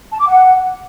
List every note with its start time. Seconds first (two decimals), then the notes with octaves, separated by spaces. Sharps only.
0.11 A5
0.19 D6
0.27 F#5